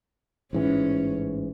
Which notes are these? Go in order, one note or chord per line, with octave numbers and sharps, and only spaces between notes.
A1 G#2 E3 C#4